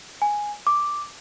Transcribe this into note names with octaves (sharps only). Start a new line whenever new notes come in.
G#5
D6